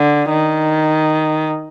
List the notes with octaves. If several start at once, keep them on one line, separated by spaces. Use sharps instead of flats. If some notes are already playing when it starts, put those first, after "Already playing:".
Already playing: D3
D#3